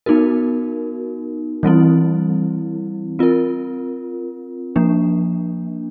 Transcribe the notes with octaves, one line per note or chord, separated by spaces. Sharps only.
B3 D#4 F#4 A#4
E3 G3 C4 E4
C4 F4 A#4
F3 A#3 D4